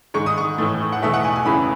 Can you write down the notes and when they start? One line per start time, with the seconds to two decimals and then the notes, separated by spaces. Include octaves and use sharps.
0.14 G#2 D#3 G#3 C#6
0.26 D#6
0.38 C#6
0.58 A2 E3 A3
0.92 F#5
1.02 E2 B2 A3 E5
1.14 F#5
1.24 G#5
1.36 G#5
1.45 E2 C#3 E3 B5